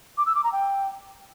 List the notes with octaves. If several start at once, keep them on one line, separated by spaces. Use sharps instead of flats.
D6
E6
D6
A#5
G5